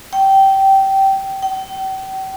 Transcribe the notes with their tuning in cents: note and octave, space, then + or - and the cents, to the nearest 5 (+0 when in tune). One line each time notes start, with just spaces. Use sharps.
G5 -15
G5 -40